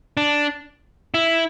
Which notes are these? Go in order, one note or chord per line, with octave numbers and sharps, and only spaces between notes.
D4
E4